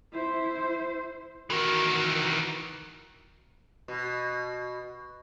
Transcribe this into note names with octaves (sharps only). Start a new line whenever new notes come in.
E4 C5
D#3 E3 F#4 A#4
B2